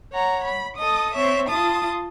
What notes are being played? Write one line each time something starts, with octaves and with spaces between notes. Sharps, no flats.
C#5 F#5 A#5
B5
A4 D#5 D#6
C4 C#5 E5
F4 A5 D#6